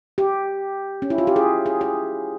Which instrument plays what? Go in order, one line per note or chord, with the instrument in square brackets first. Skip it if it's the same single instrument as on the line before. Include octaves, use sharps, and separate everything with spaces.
[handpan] G4
C#4
E4
F4
G4
G#4
G#4
G#4